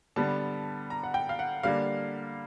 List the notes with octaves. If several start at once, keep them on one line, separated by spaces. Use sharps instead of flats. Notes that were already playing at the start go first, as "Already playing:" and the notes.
D3 G3 B3 A5
A#5
F#5
G5
F5
F#5
D3 G3 A#3 D4 F5